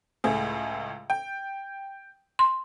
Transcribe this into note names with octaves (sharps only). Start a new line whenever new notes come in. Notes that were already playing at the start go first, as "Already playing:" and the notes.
C#2 A2 G#4
G5
C6